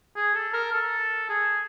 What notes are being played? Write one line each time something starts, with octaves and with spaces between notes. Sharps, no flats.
G#4
A4
A#4
A4
G#4